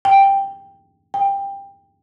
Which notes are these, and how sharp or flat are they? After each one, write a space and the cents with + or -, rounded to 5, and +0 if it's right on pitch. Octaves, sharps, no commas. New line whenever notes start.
G5 +5
G5 +15